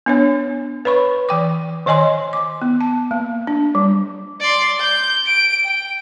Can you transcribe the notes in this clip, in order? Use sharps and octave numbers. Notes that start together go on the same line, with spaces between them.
B3 D4 C#5
B4 C#5 B5 C#6
E3 G5 D6
D#3 C#5 D#5 G#5 C6
D6
B3
A5
A#3
D4
G3
D5 C6
G6
D7
G5